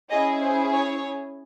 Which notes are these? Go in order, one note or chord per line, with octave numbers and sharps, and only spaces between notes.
C#4 E4 G#4 D#5
C5
C#5